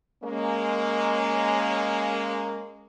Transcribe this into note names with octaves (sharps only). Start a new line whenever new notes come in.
G#3 A#3 C#4